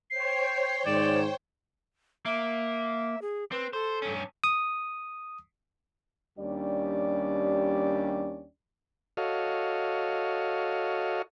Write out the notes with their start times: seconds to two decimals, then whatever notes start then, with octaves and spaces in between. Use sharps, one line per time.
0.10 C5 C#5 G5 C7
0.86 G#2 D#3 D5 E7
2.26 A#3 E5
3.22 G#4
3.52 C4 B4
3.73 A4 C5
4.02 G2 C#4
4.44 D#6
6.38 D#2 G3 C#4 D4 G4 D5
9.17 F#4 A4 C#5 D#5 F5